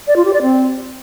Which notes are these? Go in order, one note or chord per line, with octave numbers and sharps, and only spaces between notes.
D5
F4
G4
D5
C4